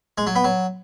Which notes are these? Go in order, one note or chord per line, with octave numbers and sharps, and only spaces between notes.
G#3
F#3
B3
F#3